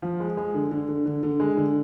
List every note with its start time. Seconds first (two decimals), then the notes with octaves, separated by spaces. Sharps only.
0.02 F3
0.20 G#3
0.37 G#3
0.54 D3
0.71 D3
0.88 D3
1.06 D3
1.23 D3
1.40 G#3
1.57 D3